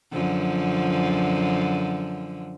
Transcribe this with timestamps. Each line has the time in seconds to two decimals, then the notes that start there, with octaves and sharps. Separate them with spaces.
0.13 F#2 D3 F3